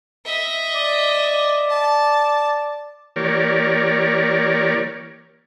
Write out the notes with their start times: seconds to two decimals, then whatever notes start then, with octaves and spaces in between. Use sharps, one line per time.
0.25 D#5 E5
0.75 D5
1.70 A5
3.16 E3 A#3 G4 A#4 C#5 D5